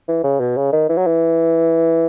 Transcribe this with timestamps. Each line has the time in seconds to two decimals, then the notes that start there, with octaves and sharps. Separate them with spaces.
0.08 E3
0.24 C#3
0.40 B2
0.57 C#3
0.73 D#3
0.89 E3
0.98 F#3
1.07 E3